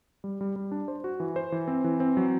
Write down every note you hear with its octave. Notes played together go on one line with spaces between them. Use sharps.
G3
G3
G3
D4
C5
F#4
E3
C5
E3
C4
E3
C4
F#3